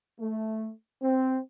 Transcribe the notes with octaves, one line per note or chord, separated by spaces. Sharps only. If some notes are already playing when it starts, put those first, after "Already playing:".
A3
C4